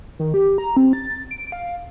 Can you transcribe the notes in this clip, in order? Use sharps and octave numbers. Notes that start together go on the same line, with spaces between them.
D#3
G4
A#5
C4
A6
D7
F5